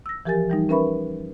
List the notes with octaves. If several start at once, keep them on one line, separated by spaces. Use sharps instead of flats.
E6 A#6
E3 F3 G4 A#4 G#5 A6
E3 G3 D#4
C#4 A#4 B4 E5 B5 C#6